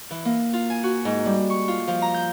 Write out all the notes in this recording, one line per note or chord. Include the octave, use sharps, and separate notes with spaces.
E3
A#3
F4
G#5
F#4
G#2
G3
C#6
F4
F3
A#5
G6